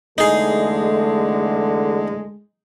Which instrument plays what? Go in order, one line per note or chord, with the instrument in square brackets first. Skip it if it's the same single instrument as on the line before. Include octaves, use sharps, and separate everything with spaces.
[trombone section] E2 D3 A4 [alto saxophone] G#3 [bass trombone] A3 [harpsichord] D#4 G#4